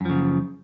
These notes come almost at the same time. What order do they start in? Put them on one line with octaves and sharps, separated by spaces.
F#2 F3 C#3